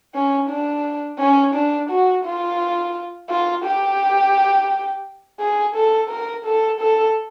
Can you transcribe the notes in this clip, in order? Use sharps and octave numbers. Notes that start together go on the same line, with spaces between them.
C#4
D4
C#4
D4
F#4
F4
F4
G4
G#4
A4
A#4
A4
A4